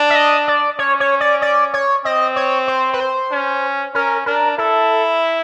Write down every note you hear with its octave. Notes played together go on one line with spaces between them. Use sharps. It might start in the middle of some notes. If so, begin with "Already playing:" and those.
Already playing: D4
E5
D#5
D5
C#4 C#5
C#5
D5
D5
C#5
C4 D#5
C#5
C5
B4
C5
C#4
C#4 A#4
D4 A#4
E4 A4